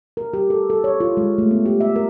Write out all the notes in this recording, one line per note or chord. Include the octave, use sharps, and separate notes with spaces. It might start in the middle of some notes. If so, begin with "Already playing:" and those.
A#4
G4
A4
A4
C#5
F4
G#3
A3
B3
G4
E5
A#4